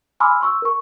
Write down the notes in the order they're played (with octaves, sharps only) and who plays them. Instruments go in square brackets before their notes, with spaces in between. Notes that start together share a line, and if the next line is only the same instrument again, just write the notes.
[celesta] G#5 B5 C6 D6 E6 F6
C6 C#6 E6
A#4 C#6